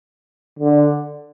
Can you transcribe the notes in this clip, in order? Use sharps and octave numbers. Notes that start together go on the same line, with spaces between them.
D3